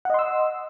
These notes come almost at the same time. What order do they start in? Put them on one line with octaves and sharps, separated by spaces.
F#5 D#5 C6 E6